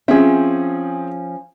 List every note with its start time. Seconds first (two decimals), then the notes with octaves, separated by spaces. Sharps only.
0.08 F3 C4 C#4 G#4 E5